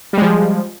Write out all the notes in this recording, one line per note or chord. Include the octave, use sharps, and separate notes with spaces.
F3 G3 G#3